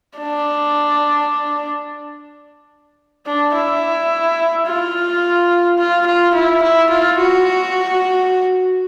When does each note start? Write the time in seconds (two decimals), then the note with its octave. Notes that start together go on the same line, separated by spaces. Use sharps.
0.19 D4
3.26 D4
3.55 E4
4.66 F4
5.78 F4
6.06 F4
6.34 E4
6.63 E4
6.90 F4
7.19 F#4